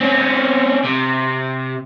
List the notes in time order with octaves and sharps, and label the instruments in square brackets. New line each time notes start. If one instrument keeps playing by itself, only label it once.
[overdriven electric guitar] C4 C#4
C3